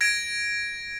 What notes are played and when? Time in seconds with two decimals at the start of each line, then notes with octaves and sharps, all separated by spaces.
0.01 G#6 A#6 D7